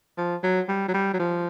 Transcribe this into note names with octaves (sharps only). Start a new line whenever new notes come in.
F3
F#3
G3
F#3
G3
F#3
F3